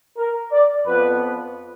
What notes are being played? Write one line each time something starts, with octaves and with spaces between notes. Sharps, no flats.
A#4
D5
F2 F3 B3 B4